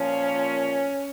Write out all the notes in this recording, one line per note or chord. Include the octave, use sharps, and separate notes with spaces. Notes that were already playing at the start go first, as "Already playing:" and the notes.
Already playing: A#2 F3 C#4